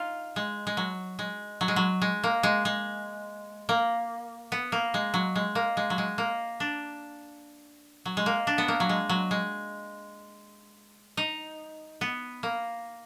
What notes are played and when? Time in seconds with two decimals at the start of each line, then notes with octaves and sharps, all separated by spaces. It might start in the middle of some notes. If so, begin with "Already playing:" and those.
Already playing: D#4 F4
0.36 G#3
0.67 G#3
0.77 F#3
1.19 G#3
1.61 F#3
1.68 G#3
1.76 F#3
2.02 G#3
2.24 A#3
2.43 G#3
2.65 G#3
3.69 A#3
4.52 B3
4.72 A#3
4.94 G#3
5.14 F#3
5.36 G#3
5.55 A#3
5.77 G#3
5.90 F#3
5.98 G#3
6.18 A#3
6.60 D4
8.05 F#3
8.17 G#3
8.26 A#3
8.47 D4
8.58 B3
8.68 A#3
8.80 F#3
8.89 G#3
9.09 F#3
9.31 G#3
11.17 D#4
12.01 B3
12.43 A#3